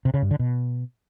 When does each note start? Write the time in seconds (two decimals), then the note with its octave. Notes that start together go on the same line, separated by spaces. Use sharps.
0.05 C3
0.14 C#3
0.22 G2
0.31 D3
0.39 B2